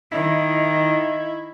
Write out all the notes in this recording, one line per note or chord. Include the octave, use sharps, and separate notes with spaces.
D#3 E4 D#5